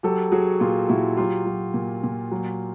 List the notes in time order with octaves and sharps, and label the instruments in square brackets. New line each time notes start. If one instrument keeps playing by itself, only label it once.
[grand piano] F#3 G4 A4
F#3 F#4 G#4
A#2 F4 G4
A#2 E4 F#4
F#3 F4 G4
F#3
A#2
A#2
F#3